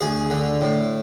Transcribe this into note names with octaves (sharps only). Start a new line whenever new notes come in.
D2 G#4
D3
A2